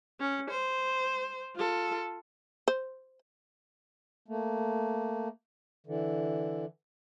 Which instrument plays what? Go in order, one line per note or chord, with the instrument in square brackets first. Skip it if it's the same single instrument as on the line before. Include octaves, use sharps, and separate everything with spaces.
[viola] C#4
C5
F4 A4
[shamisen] C5
[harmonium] A3 A#3
D3 E3